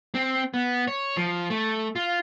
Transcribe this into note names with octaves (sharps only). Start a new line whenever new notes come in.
C4
B3
C#5
F3
A3
F4